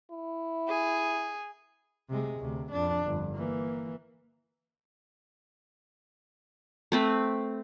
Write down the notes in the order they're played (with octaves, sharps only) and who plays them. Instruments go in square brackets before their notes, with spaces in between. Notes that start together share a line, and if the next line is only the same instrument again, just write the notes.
[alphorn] E4
[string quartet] G#4
[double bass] C3 G#3
D2 C3
F2 D4
G1 F2
E3 A#3
[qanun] A3 C4 B4